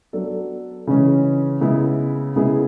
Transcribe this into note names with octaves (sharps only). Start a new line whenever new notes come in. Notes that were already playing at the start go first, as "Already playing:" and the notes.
F#3 B3 D4 A4
C#3 E3 G#3 C#4
C#3 G#3 B3 E4
C#3 G#3 B3 E4 G#4